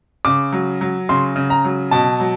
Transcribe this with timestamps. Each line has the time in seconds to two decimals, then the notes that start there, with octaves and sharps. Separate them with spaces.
0.25 C#3 D6
0.53 F#3
0.81 F#3
1.09 C#3 C6
1.36 C#3
1.50 A#5
1.65 F#3
1.91 B2 A5
2.20 F#3